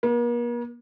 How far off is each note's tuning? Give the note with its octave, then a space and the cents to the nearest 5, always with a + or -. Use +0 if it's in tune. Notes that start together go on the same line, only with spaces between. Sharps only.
A#3 +45